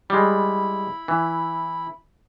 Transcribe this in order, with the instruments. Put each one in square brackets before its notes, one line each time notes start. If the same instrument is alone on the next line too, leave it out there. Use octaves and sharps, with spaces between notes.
[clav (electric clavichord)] G3 G#3 [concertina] E4 B5
[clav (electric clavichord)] E3